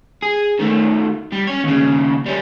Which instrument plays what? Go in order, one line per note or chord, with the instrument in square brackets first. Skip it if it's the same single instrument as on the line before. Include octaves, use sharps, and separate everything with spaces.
[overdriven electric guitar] G#4
D#3 A3
G3
C#4 C#5
D#2 C#3
G3 C#4